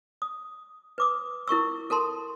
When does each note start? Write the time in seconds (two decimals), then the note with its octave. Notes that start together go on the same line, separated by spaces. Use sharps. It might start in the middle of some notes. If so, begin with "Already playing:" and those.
0.22 D#6
0.98 B4 D6 D#6
1.48 E4 A#4 C#6 E6
1.90 A4 A#4 A5 C6